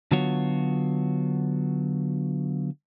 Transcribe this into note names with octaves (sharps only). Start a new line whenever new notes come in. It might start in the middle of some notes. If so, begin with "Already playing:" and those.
D3 F#3 B3 F4 F#4 C#5